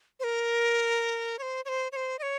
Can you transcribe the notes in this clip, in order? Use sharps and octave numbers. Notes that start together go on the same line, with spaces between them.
C5
A#4
C#5
C5
C#5
C5
C#5
C5
D#5
C#5